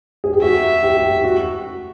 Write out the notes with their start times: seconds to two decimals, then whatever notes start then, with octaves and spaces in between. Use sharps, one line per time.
0.24 G#4
0.33 G4
0.42 F#4 E5
0.83 G4
0.97 G4
1.10 G4
1.24 F#4